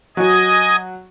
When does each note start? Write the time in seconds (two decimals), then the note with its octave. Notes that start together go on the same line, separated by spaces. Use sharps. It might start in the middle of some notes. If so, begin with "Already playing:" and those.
0.17 F#3 F#4 D#5 G#5